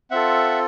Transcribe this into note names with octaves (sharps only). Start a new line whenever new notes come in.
C4 F4 A4 E5 F#5